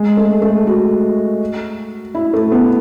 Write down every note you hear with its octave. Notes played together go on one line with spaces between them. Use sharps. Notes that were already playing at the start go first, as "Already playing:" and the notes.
Already playing: G#3
A3
A3
F#4
E4
A3
B3